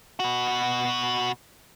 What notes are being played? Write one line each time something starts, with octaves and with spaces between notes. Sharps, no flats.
B2 F#4